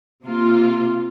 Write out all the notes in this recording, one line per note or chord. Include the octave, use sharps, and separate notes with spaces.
C3 A#3 F4